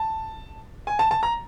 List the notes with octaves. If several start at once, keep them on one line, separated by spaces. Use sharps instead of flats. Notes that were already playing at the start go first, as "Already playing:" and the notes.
Already playing: A5
G#5
A5
A5
A#5